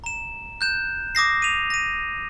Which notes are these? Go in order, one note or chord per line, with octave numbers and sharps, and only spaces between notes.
A#5 E7
F#6 G6 E7
D6 D#6 A#6 C7
D#7 F7
A#6 D#7